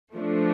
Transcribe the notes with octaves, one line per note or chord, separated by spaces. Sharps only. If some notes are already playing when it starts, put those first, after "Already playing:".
F3 A3 D4